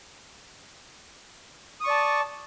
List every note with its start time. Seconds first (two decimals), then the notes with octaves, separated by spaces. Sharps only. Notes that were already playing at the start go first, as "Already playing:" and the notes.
1.81 D#6
1.84 C#6
1.87 D5
1.90 A5